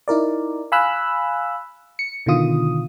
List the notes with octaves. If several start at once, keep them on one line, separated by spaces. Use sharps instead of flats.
D#4 E4 A#4 D5
F5 G#5 B5 E6 F#6
C#7
B2 D3 D#3 F4 D#6